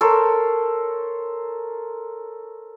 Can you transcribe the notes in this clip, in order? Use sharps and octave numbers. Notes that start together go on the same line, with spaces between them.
A4 A#4 C5 C#5